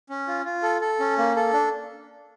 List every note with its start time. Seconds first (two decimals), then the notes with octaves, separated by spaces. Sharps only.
0.10 C#4
0.28 F4
0.45 F4
0.63 A4
0.81 A4
1.00 C#4
1.18 A#3
1.36 A4
1.53 D4